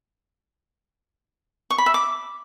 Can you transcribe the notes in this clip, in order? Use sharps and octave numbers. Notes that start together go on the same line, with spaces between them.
C#6
B5
E5
D6